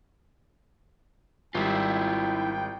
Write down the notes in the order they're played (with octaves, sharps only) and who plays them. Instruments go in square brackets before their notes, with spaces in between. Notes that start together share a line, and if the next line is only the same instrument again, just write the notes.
[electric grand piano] G#1 G3 [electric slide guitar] E4 F4 [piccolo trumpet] G5